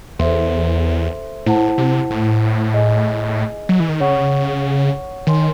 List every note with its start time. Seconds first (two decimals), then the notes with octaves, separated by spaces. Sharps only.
0.19 E2 A4 C5 E5 C6
1.46 A2 E4 C5 F#5 A5
1.78 C3
2.10 A2
2.74 G#4 D#5 G#5
3.69 F#3
3.80 E3
3.89 D#3
4.00 C#3 C#5 F#5 C#6
5.27 D#3 C#5 G#5 C6